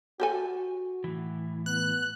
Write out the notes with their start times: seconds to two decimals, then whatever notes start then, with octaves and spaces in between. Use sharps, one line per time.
0.20 F#4 G4 A4 G#5
1.04 A2 E3
1.66 B3 F#6